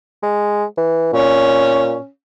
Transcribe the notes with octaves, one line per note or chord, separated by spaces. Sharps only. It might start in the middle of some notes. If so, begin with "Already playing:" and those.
G#3
E3
A#2 C#4